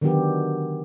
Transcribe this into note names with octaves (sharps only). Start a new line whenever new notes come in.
D3 D#3 F#3 B3 D4 G4